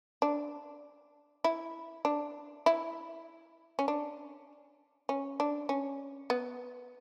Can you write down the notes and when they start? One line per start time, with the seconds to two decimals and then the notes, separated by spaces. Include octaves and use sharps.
0.22 D4
1.44 E4
2.05 D4
2.66 E4
3.79 C#4
3.88 D4
5.09 C#4
5.40 D4
5.69 C#4
6.30 B3